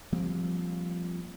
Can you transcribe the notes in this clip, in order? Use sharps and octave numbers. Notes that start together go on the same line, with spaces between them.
F3 G3 A#3 C4